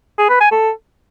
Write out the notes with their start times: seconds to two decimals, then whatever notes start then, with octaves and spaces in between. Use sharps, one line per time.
0.19 G#4
0.30 B4
0.41 G#5
0.52 A4